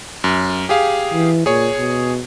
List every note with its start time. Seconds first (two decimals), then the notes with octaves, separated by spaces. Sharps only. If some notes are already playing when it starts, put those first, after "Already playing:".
0.24 F#2
0.69 G4 G#4 F5
1.13 E3
1.46 A#2 G#4 C#5
1.78 B2